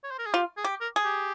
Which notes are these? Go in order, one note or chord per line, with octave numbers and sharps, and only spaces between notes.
C#5
C5
A#4
G#4
F4 G4
G#4
G4
A#4
G#4
G4